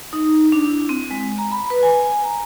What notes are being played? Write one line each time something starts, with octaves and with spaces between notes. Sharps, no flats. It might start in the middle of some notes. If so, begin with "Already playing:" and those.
D#4
D4
E4
C4
G#3
A#5
B5
B4
G#5
A#5